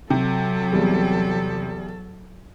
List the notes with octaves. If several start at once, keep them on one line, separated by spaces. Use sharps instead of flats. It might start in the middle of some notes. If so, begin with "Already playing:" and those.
C3 F#3 A4
E2 G3